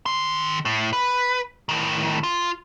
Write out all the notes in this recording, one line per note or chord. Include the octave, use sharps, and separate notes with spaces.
D#3 C6
A2
B4
A2 D#3
F4